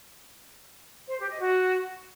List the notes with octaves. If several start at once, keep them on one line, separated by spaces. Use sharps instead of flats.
C5
G4
D#5
F#4